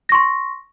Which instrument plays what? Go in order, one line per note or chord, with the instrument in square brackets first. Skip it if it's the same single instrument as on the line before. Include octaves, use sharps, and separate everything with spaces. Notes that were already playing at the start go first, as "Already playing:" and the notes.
[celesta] A#6
C#6
C6